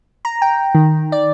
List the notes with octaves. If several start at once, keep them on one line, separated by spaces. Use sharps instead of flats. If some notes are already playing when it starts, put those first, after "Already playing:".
A#5
G5
D#3
D5